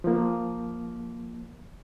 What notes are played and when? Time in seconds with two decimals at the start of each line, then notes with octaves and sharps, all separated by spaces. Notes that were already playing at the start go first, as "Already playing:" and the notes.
0.04 F3 A#3